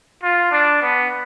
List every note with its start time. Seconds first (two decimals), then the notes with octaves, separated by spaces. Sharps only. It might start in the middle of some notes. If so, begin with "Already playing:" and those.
0.23 F4
0.51 D4
0.82 B3